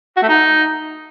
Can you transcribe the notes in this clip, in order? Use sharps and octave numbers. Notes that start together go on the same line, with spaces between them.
F#4
A3
D#4